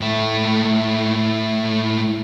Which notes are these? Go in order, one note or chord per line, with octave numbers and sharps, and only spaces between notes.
A2 A3